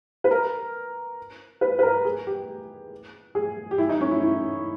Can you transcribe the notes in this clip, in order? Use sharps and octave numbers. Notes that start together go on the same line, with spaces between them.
B4
A#4
B4
B4
A#4
G#4
G4
G#4
G4
E4
D#4
C#4
E4
E4